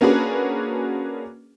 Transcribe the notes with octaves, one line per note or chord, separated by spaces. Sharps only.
A#3 C#4 D4 F#4 G#4 B4